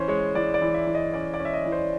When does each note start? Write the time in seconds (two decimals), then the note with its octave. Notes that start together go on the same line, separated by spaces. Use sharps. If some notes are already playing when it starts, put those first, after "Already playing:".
Already playing: E3 C#4 C5
0.08 G#3 C#5
0.35 E3 D5
0.54 D5
0.62 E3
0.74 E5
0.87 E3
0.95 D#5
1.14 C#4 D5
1.34 D5
1.40 C#4
1.45 E5
1.54 D#5
1.66 E3
1.72 C5